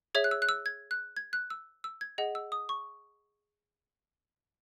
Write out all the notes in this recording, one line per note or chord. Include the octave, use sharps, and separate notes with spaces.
G#4 C#5 E5 G#6
F#6
E6
F#6
E6
G#6
F#6
G#6
F#6
E6
E6
G#6
G#4 D#5 F#5
E6
D#6
C#6